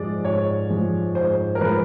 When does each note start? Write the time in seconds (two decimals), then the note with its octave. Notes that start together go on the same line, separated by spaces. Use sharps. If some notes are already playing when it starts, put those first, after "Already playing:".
Already playing: G#2 F3 G#3 D5
0.25 G#2 C#5
0.70 F3 G#3
1.15 G#2 C5
1.55 A#4
1.61 F3 G#3 B4